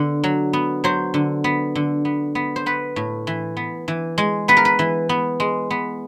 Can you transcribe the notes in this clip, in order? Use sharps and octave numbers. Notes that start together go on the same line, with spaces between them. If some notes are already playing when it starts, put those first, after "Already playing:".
Already playing: D3 B3
F#3
B3
F#3 C5
D3
B3
D3
B3
B3
C5
B3 B4
A2
E3
B3
E3
G#3
B3 B4
A#4
B4
E3
B3
G#3
B3